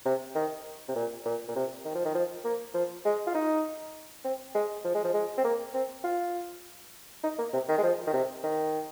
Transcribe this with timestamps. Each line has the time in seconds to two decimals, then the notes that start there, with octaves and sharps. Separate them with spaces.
0.06 C3
0.35 D#3
0.89 C3
0.96 A#2
1.26 A#2
1.49 A#2
1.56 C3
1.85 D#3
1.95 F3
2.05 D#3
2.15 F3
2.45 A#3
2.74 F3
3.05 G#3
3.27 F4
3.35 D#4
4.24 C4
4.55 G#3
4.85 F3
4.95 G#3
5.04 F3
5.14 G#3
5.38 C4
5.45 A#3
5.74 C4
6.04 F4
7.24 D#4
7.39 A#3
7.54 C3
7.69 D#3
7.78 G#3
7.83 F3
8.07 D#3
8.13 C3
8.44 D#3